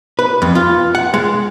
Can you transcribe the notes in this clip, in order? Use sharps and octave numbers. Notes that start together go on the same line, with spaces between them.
B4
F2
F4
F#5
G#3